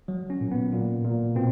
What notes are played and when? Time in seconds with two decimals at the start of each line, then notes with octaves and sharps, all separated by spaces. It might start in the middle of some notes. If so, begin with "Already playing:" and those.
0.08 F#3
0.30 C#4
0.41 A#2
0.51 B3
0.72 A#2
1.04 A#2
1.35 B2 C4